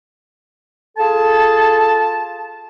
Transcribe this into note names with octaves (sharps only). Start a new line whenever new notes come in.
F4 G#4 A4 A5